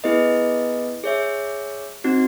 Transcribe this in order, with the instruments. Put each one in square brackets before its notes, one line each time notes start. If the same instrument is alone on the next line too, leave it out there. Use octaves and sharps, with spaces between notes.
[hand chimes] B3 E4 G#4 B4 D#5
G#4 C#5 E5
C4 D#4 F#4